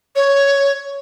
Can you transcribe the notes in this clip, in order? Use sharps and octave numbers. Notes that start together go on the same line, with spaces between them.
C#5